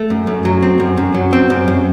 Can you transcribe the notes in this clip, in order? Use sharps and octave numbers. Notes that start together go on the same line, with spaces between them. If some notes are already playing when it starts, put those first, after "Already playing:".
Already playing: A3
F#2
F#2
F#3
C4
F#2
F#2
F#3
C4
F#2
F#2